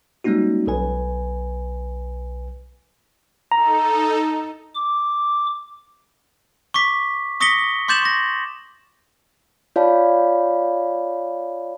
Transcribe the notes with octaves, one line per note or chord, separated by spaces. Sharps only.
G3 G#3 A#3 C#4 D#4 F#4
B1 B4 G#5
D#4 A4 A#5
D6
C#6 D6 B6
C#6 D#6 A#6 B6 C#7 G7
C6 D6 G6 A6 E7 F#7
C#6 A#6
F4 C#5 D5 F5 A5 B5